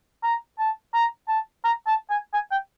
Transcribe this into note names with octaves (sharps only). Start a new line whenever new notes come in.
A#5
A5
A#5
A5
A#5
A5
G#5
G#5
G5